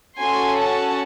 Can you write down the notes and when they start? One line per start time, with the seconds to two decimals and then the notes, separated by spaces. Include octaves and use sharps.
0.18 C#4 F#4 A4 G#5 C6
0.57 F#5 A5